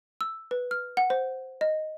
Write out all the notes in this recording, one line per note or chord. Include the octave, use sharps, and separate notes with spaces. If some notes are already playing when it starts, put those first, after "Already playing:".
E6
B4
F6
F#5
C5
D#5